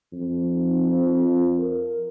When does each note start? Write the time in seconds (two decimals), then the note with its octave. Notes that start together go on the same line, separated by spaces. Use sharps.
0.13 F2
0.51 D#4
0.88 F3
1.58 A#4